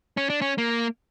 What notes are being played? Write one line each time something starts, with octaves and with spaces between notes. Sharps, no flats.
C#4
D4
C#4
A#3